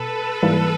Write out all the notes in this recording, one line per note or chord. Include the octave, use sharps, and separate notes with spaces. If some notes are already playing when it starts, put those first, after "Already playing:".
Already playing: B2 A4 B4
G#2 E3 G3 A#3